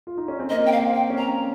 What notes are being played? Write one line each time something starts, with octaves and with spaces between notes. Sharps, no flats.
F4
D#4
C#4
C4
A#3 D#5
G5
F5
C4
G5
C#4
A#5